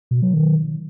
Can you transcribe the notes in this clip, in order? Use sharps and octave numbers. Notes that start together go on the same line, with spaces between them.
B2
F#3
D#3